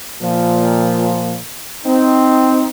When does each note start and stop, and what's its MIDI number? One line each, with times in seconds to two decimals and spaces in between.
0.22 1.38 46
0.22 1.38 53
1.85 2.67 60
1.85 2.67 63